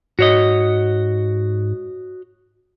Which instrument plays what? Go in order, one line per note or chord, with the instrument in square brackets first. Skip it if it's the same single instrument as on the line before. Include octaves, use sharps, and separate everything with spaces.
[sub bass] G#2 [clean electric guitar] F#4 C#5 D#5